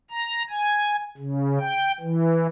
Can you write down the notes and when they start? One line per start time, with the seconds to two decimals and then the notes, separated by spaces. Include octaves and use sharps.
0.10 A#5
0.50 G#5
1.18 C#3
1.59 G5
2.00 E3